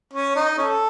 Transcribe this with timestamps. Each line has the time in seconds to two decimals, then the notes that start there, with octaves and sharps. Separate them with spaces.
0.14 C#4
0.36 D#4
0.58 C#4 A4